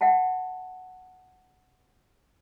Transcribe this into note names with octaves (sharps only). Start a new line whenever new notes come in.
E5 F#5 G5 A5